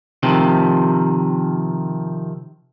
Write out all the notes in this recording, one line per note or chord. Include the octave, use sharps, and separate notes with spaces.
C3 D#3 F3